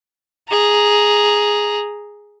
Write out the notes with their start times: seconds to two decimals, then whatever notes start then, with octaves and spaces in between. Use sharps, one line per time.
0.49 G#4 A#5